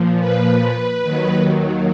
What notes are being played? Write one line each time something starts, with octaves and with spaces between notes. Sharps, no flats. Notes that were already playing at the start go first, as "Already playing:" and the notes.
Already playing: A#2 F3
B4
D#2 D#3 F#3